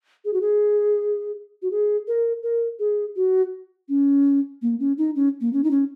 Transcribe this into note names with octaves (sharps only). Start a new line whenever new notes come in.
G#4
F#4
G#4
F#4
G#4
A#4
A#4
G#4
F#4
C#4
A#3
C#4
D#4
C#4
A#3
C#4
D#4
C#4